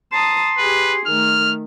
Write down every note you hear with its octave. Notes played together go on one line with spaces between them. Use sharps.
A5 A#5 C6 D#6
G4 G#4 B4
D#3 A3 F6